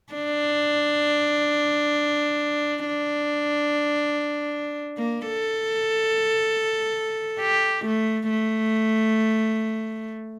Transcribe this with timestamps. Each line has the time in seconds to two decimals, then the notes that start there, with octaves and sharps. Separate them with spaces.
0.14 D4
2.86 D4
4.97 A#3
5.27 A4
7.40 G4
7.85 A3
8.30 A3